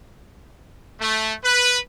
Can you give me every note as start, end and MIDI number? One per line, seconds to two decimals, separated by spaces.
1.01 1.34 57
1.44 1.78 71